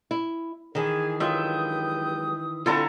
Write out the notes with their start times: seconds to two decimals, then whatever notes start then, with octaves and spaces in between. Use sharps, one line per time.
0.11 E4
0.75 D#3 E3 G#4
1.20 G2 F#3 G#3 F4 E5 G5 D#6
2.66 D3 G3 C4 E4 F4 A4 A#5